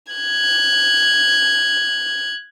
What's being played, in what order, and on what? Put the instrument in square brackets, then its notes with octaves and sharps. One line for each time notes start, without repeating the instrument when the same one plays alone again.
[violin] F#6 G#6